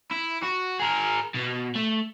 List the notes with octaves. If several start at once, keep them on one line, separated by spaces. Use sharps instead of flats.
E4
F#4
G#4 A#4
B2
A3